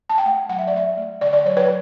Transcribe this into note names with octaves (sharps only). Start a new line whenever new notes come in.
A5
G5
A3 F#5
F#3 F#5
E5
D5
A3 E5
A3
D3 D5
D5
F#3 C#5
B4